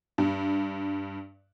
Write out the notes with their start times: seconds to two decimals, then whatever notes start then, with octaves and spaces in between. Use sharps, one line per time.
0.18 G2